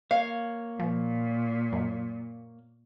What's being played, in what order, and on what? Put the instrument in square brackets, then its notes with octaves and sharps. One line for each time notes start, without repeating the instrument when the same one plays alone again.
[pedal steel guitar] A#3 C#5 [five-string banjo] F5
[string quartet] A#2 [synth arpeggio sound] F3
[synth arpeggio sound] F#2